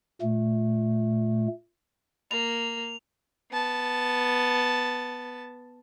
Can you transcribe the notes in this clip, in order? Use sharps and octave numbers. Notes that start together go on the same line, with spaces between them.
A#2 A3
A#3 F7
B3 A5